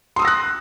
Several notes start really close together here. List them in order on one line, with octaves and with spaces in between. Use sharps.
C6 D#6 E6 A#6 F#6